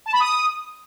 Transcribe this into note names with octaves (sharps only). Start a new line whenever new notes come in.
A5
B5
D#6